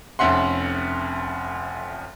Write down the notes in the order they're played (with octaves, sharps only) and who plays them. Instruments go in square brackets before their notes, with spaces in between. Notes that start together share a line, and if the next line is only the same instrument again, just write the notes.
[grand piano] F1 F2 C#4 E5 F#5 C6